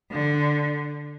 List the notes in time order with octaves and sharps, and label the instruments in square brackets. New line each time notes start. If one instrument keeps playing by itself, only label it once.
[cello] D3